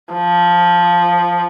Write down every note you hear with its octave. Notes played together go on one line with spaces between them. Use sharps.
F3